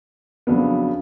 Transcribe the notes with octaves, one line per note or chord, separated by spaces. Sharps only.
F2 C#3 F#3 B3 D4